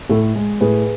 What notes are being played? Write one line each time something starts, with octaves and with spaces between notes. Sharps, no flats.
A2 A4
G#3
A2 G#4 B4